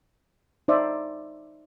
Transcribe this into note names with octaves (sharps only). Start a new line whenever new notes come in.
D#4 C5 D5 E5